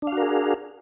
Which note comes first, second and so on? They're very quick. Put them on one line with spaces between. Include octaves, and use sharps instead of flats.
D4 F5 F#4 A#4 G#4